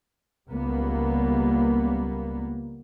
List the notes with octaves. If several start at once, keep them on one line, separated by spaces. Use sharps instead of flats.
C#2 G3 A#3 B3